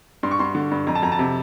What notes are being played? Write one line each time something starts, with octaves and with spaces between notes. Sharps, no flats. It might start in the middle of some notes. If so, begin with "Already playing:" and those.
G2 C6
C#6
G2 C6
D3
G2
F2 A#5
A5
F2 A#5
A5
C3